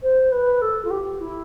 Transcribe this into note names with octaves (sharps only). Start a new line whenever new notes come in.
C5
B4
A4
F4
G4
E4